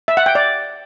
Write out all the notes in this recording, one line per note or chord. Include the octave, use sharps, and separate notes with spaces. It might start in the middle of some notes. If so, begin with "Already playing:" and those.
E5
F#5
G5
D5